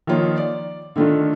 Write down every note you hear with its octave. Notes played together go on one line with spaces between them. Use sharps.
D#3 F3 A#3 F4 C#5
D5
D3 D#3 A3 D4 F4